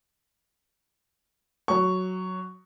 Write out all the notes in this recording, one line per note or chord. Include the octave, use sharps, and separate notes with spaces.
F#3 C#6